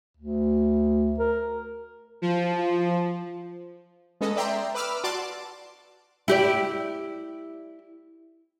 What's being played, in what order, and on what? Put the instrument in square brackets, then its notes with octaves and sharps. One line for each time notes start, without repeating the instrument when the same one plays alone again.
[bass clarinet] D2
A#4
[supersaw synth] F3
[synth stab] G#3 B3 C#4 A4 D#5
D5 E5 G5 A#5 C6
B4 B5 D6 E6 F6
F#4 D5 A5 C6 D6
[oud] E4 G4 D5